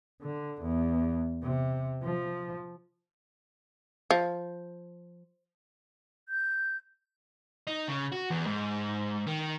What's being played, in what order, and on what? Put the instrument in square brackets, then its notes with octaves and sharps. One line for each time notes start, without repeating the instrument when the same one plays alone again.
[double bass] D3
E2
C3
F3
[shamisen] F3
[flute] G6
[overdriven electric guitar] D#4
C#3
F#4
E2
G#2
D#3